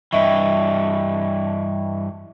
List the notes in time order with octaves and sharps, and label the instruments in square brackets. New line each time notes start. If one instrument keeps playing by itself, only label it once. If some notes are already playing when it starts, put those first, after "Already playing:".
[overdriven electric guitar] G2 E3 [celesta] D#5 E5 C#6